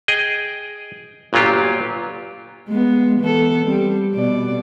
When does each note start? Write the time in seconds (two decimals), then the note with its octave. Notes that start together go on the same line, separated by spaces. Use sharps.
0.08 G#4 D#5 G5
1.33 G1 A#2 F#3 F4 G4
2.68 G#3 B3
3.20 E3 B3 A4
3.64 G3 C4
4.14 B2 D5